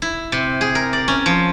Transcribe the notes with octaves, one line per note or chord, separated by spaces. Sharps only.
E4
C3
G#4
A#4
D5
C#4
F3